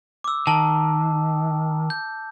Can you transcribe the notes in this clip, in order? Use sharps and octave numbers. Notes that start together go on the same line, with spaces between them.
D6 E6
D#3 A5
G6